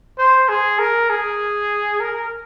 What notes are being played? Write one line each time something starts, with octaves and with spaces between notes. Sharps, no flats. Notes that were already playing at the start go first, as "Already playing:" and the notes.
C5
G#4
A#4
G#4
A#4